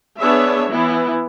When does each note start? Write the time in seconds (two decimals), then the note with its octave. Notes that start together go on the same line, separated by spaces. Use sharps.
0.20 B3 D4 G#4 C#5 E5
0.69 E3 B3 E4